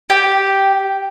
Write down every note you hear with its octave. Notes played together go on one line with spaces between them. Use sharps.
G4